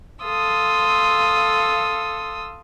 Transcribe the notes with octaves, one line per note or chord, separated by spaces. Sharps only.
A4 F5 C6 D#6 E6